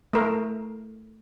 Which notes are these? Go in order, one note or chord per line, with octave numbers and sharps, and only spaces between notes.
A3 A#4